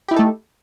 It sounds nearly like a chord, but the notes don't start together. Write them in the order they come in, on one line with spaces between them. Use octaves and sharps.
G4 E4 D#4 A4 A3